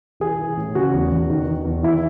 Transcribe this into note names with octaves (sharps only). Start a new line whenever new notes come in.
E3 G#4
E3
A2
C#3 F#4
E2
E2
D#3
D#3
E2
E3 E4